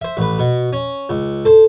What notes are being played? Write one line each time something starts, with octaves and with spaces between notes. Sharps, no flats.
C5 E5
A1 B4
B2
C#4
C#2
A4 C5